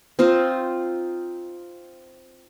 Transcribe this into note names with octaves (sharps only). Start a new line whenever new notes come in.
C4 D#4 F4 C5